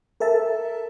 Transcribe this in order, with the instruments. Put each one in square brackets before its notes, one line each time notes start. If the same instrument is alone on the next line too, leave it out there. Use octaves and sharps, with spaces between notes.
[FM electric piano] A4 A#4 E5 A5